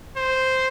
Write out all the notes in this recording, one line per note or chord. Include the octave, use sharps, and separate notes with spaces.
C5